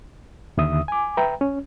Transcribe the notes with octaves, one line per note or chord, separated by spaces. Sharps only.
D#2 D3 E5 D#6
G#5 D6
B4 E5 G5 A#5
C#4